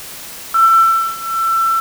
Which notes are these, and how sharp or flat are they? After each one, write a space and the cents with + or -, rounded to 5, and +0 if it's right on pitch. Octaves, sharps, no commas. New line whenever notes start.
E6 +25